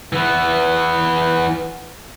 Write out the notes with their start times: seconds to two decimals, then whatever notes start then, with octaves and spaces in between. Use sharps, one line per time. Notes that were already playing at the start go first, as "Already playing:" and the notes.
0.13 E3 B3